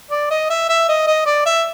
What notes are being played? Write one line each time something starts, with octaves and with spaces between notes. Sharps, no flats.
D5
D#5
E5
E5
D#5
D#5
D5
E5